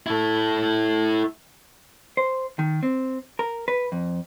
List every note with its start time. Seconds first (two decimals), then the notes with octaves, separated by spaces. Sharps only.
0.07 E4 A4
2.17 C5
2.59 D#3
2.83 C4
3.39 A#4
3.68 B4
3.92 F2